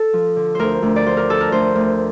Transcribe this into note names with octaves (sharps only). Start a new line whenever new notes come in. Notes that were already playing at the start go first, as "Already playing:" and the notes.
Already playing: A4
F3
D3
D2 A#4 C5
D2
D5
F3 C5
A#4
D3 A4
A#4
D2 C5
D2